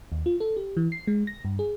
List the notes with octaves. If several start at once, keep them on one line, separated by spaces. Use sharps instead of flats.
D#2
F4
A4
G4
E3
C7
G#3
A#6
G2
G#4